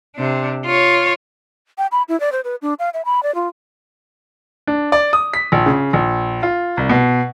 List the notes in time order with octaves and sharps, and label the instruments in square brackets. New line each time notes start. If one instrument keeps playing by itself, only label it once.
[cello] C3 D4
F4 C#5
[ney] G5
B5
E4
D5
C5
B4
D4
F5
E5
B5
D5
F4
[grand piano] D4
D5
D#6
B6
A#1
C#3
A#1
F4
C2
B2